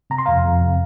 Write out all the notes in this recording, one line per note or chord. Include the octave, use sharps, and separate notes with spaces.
C3 A#5
C6
F2 F5 A#5
F2
C3